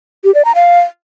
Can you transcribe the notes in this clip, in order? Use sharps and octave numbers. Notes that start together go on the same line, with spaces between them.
G4
D5
A#5
F5